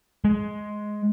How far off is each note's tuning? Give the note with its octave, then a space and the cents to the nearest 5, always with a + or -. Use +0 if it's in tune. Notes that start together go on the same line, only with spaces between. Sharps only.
G#3 +10